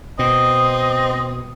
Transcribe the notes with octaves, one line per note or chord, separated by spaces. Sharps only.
B2 C4 D#5 D#6